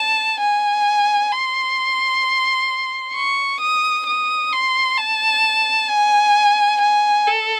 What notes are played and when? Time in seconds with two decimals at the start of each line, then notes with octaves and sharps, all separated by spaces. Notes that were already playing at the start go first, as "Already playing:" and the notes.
Already playing: A5
0.41 G#5
1.32 C6
3.15 C#6
3.61 D#6
4.07 D#6
4.52 C6
4.98 A5
5.89 G#5
6.81 G#5
7.27 A4